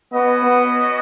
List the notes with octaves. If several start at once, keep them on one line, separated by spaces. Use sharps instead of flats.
B3 C#4 F#4 B4 D#5
B3